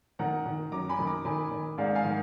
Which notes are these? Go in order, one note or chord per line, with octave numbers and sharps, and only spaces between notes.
D#3 F#5 A#5
D#3
F#2 A#5 D6
G#5 B5
D#3
A#5 D6
D#3 G#5 B5
D#3
G#2 D5 F5
F5 G#5
D#3